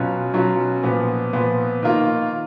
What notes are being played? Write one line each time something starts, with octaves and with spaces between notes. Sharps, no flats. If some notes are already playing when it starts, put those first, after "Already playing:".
Already playing: B2 F#3 C#4 F4
B2 F#3 C#4 F4
A#2 F3 B3
A#2 F3 B3
D#3 A#3 F4